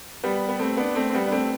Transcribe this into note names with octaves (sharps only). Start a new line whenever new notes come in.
G3 B3
B3
A3 C4
B3 D4
A3 C4
C4
G3 B3
D4
A3 C4